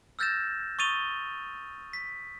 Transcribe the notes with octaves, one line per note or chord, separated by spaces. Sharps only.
E6 F6 G6 A6 A#6 E7
C#6 D#6 A6 D#7 F7 G7
B6